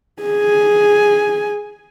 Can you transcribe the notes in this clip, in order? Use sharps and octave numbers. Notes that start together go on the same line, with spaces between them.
G#4 G#5